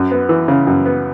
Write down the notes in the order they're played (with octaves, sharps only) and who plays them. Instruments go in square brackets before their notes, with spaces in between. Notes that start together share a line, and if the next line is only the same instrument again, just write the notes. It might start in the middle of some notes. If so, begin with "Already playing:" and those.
Already playing: [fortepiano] F#2
B3
E3
C#3
F#2
B3